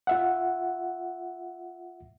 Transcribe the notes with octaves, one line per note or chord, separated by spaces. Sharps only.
F4 E5 F#5